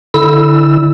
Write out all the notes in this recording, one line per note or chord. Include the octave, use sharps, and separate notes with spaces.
D3 E4 E6